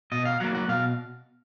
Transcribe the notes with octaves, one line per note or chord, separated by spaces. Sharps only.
B2 D#5
F5
F#3 A#3 F#5
F#5
B2 F5